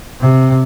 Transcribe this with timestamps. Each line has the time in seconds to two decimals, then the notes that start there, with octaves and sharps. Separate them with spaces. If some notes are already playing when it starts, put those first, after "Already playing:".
0.20 C3